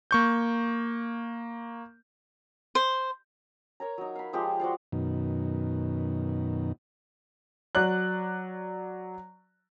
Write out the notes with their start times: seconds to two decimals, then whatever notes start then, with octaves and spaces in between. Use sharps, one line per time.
0.11 A#3 C#6 G6
2.75 C5
3.80 A#4 C#5 A#5
3.98 F#3 D#4
4.15 F5 B5
4.33 F3 G#3 G4 E5
4.60 F#4 C5 D5 F5
4.92 F#2 B2 D#3
7.75 F#3 D5 F#6